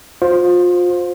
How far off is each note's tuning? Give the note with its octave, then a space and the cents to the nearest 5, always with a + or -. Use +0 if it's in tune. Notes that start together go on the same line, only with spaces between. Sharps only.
F4 +30 C5 +0